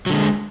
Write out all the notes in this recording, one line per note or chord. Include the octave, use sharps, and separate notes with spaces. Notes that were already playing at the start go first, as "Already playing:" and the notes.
D3 F#3 G#3